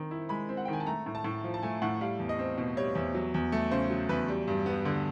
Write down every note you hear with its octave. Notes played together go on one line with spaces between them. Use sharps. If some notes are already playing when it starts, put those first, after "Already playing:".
Already playing: D#3 C4
E4
G#3 B5
C4
F#5
G5
D#3 G#5
A5
A3 A#5
A2
A5
A2
F3
A5
A3 G#5
A2 F#5
G3 F5
E2
D#5
C4
B2
G3 C#5
E2
F#3
E2
A3
C#3 C5
F#3
E2 B4
G3
G2
B3
D3